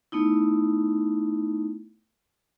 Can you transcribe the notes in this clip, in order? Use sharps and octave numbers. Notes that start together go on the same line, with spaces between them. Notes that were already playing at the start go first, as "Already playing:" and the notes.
A3 B3 D#4 E4